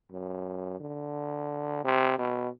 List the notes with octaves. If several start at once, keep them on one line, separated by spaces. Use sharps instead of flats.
F#2
D3
C3
B2